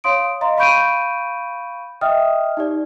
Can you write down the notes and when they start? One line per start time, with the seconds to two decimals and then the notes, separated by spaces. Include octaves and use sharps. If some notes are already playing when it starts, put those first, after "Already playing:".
0.04 C#5 F5 C6 D#6 D7
0.41 D#5 F5 A#5 C6
0.57 F5 B5 C#6 G6 D7 D#7
2.01 D#5 E5 G5 D#6 F6
2.57 D#4 G4 D5